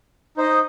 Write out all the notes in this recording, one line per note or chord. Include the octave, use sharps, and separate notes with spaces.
D#4 C5 D#5